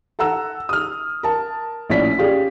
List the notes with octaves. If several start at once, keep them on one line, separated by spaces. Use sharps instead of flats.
A4 F#5 A#5 E6
D#6 F6
A#4 A5
A#1 A2 C#4 E4 D5 B6
C#4 F4 G4 G#4 D5